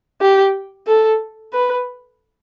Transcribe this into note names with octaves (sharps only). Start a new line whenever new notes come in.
G4
A4
B4